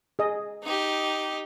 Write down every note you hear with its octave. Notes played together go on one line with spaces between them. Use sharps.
G#4 D#5
D#4 G4